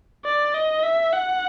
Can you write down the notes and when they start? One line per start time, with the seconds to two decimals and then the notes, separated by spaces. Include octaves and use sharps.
0.25 D5
0.54 D#5
0.83 E5
1.13 F#5